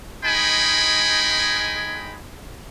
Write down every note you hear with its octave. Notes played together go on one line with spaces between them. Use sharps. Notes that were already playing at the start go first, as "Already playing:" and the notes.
G#3 D#4 G5 G#5 B5